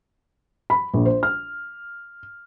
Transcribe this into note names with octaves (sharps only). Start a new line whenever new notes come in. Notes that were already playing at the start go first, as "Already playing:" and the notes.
B5
A#1
C5
F6